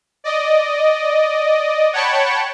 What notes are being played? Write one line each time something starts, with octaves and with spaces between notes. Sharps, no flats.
D5 D#5
C#5 F#5 G5 A5 B5 C#6